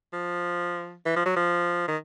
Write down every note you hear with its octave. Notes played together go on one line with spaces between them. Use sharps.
F3
E3
F3
F#3
F3
D#3